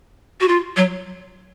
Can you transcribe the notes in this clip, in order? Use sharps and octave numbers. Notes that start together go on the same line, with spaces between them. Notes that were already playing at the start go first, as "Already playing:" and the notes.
F#4
F4
F#3